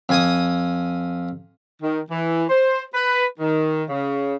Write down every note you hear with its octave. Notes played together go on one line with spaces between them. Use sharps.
F2 G#5 D#6
D#3
E3
C5
B4
D#3
C#3